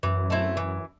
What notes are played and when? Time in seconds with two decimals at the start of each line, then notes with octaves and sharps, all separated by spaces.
0.03 F#2 E3
0.30 A3 C4 E4
0.57 E3